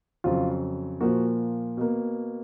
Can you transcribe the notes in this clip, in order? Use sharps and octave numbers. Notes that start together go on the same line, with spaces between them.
F2 C#3 F#3 F4
A#2 F3 A#3 F#4
B2 A#3